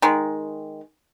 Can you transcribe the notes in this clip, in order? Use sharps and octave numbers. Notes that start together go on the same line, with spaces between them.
D#3 G#3